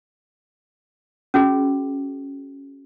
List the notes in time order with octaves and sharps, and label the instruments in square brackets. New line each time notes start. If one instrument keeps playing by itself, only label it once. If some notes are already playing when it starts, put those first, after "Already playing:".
[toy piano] C#4 F#4 G#4